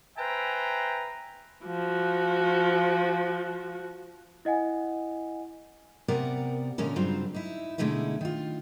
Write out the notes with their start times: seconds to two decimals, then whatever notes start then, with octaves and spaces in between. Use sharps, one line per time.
0.18 B4 C5 E5 G5 G#5 A#5
1.65 F3 F#4
4.45 E4 D#5 F#5 G#5
6.08 C3 B3 A#4 D5 F#5
6.78 A#2 D3 E3 G#3 C#4 A#4
6.96 G2 C#3 F#3 C4 F4 C5
7.34 D#4 E4
7.78 B2 D3 G#3 A3 D#4 E4
8.21 D#3 F4